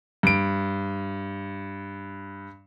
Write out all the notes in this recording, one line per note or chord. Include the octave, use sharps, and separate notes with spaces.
G2 D7